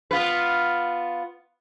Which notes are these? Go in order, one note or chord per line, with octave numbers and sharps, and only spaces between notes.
B3 F4 B4